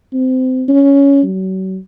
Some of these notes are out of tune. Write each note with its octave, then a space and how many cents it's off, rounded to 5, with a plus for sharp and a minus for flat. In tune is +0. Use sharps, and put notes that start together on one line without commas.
C4 -25
C#4 +10
F#3 +35